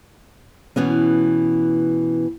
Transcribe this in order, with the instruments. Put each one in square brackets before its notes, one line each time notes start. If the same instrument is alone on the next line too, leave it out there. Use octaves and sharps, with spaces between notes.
[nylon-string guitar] B2 E3 B3 C#4